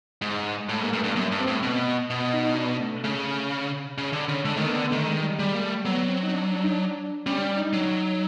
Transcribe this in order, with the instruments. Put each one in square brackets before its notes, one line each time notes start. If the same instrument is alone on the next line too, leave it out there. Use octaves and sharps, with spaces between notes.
[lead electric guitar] G#2
[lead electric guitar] A2 [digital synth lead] G#3
[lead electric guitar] G#2 [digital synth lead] A#3
[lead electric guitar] G2 [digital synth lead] A3
[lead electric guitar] G2
[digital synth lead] B3
[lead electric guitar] F#2 [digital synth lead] A#3
[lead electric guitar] G2
[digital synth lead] C4
[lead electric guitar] A2
B2
B2
[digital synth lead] D#4
D#4
D4
A3
[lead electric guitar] C#3 [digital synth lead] A3
[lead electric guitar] C#3
D3
C#3
[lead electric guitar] D3 [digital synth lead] G#3
[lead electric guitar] D#3 [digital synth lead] A3
[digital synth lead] A#3
B3
[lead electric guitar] D3
[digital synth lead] B3
[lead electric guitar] D#3 [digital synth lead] A3
[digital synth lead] G#3
G3
[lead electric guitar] G3 [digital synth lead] G#3
[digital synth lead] A#3
A3
[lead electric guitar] F#3 [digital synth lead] B3
[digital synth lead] C4
D#4
D4
D4
D#4
D4
[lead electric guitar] G3 [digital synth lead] C#4
[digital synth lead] D4
D#4
[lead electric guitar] F#3